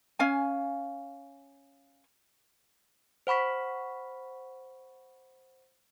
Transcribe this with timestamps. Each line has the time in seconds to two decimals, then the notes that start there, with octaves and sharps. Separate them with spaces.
0.19 C#4 F5 G#5
3.27 C5 F#5 B5 C#6 B6